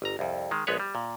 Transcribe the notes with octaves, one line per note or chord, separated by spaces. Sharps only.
G1 A#5
C2 F2
D#3 G#3
A#1 G#3 B3 B4 C#5
G3
A#2